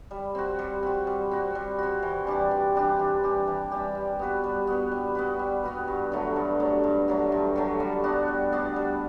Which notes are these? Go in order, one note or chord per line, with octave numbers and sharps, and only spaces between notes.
G3
C4 F#4
G3
C4 F#4
G3
C4 F#4
G3
C4 F#4
E3
G3 D4 G4
E3
G3 D4 G4
E3
G3 D4 G4
E3
G3 D4 G4
G3
B3 F#4 B4
G3
B3 F#4 B4
G3
B3 F#4 B4
G3
B3 F#4 B4
G2
D3 F#3 A3
G2
D3 F#3 A3
G2
D3 F#3 A3
G2
D3 F#3 A3
G3
B3 D4 F#4
G3
B3 D4 F#4
G3